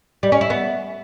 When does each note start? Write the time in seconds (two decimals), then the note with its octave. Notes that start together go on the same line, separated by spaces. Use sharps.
0.23 G3
0.32 C#4
0.41 E4
0.50 B3